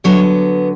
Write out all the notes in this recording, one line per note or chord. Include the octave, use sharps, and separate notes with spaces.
D3 F#3 B3 C#5